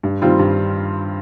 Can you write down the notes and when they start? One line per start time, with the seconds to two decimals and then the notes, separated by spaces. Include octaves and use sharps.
0.03 G2
0.22 D#3 G3 C4 F4
0.39 G2